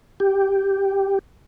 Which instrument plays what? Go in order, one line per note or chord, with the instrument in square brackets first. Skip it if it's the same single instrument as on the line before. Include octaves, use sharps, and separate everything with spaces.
[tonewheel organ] G4